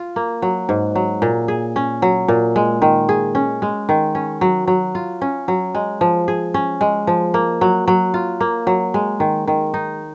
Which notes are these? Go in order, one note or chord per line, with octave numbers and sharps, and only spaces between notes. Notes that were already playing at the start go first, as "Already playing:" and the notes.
Already playing: F4
A#3
F#3
G#2
F#3
A#2
G#4
C#4
F#3
A#2
G#3
D#3
G#4
C#4
G#3
D#3
C#4
F#3
F#3
F4
C#4
F#3
G#3
F3
G#4
C#4
G#3
F3
A#3
F#3
F#3
F4
A#3
F#3
G#3
D#3
D#3
D#4